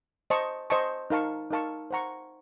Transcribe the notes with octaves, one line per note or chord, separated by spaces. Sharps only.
C5 D#5 A5 C#6
C5 D#5 A5 C#6
D#4 A#4 F5 A5 C#6
D#4 A#4 F5 A5 C#6
C5 F#5 A#5 C#6